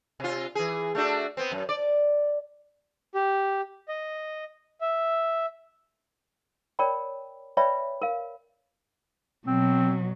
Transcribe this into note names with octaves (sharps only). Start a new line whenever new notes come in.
C3 F4
E3 G#4
A3 D4 F#4
B3 C4
F#2
D5
G4
D#5
E5
A#4 C#5 D5 G5 B5
B4 C#5 D5 E5 G5 B5
A#4 F5
B2 F#3 C4